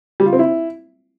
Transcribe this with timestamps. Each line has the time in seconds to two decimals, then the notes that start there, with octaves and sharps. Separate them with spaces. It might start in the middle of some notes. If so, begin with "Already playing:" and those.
0.20 G3
0.26 F4
0.33 C4
0.39 E4